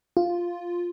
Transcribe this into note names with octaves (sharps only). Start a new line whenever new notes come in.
F4